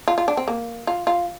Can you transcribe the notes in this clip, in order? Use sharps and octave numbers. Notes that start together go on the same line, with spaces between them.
F4
F4
D4
C4
A#3
F4
F4